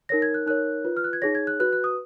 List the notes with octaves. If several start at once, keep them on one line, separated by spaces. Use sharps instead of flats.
D#4 A#4 C#5 A#6
G#6
F#6
D#4 A#4 C#5 F#6
F4 B4
F6
F#6
G#6
D#4 G#4 C#5 A#6
G#6
F#6
F#4 B4 F#6
F#6
D#6